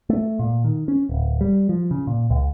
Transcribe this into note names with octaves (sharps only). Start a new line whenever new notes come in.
A3
A#2
D#3
C#4
D1
G3
F3
C#3
A#2
C#2